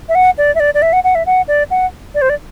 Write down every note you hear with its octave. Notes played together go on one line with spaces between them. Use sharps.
E5
F#5
D5
E5
D5
D5
E5
F#5
F#5
E5
F#5
D5
F#5
D5
C5
D5